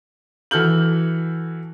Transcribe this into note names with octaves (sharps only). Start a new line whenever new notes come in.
E3 F#4 A4 F6 G6 F#7